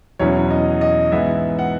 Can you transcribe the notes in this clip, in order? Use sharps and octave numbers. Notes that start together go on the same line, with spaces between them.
E2 B2 F#3 C#4 E4 C#5
D#5
D#5
G#2 E3 B3 E4 E5
F#5